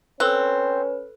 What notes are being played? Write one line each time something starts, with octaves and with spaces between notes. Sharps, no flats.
C4 C#4 A4 B4 F#6